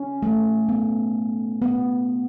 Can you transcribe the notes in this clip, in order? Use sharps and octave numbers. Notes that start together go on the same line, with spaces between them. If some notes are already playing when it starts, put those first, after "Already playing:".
Already playing: C#4
A3
B3
B3